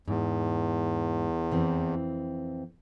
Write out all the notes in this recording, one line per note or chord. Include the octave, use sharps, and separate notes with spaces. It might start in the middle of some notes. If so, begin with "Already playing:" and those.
E2 G#2
F2 E3 C4